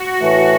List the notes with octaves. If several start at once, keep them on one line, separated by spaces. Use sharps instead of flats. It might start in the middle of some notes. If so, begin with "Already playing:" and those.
Already playing: F#4
A2 E3 A3